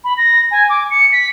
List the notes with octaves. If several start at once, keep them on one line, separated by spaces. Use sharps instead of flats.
B5
A#6
G#5
D6
C#7
B6